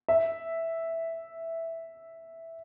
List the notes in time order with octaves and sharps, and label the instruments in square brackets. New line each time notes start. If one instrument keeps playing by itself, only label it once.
[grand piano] E5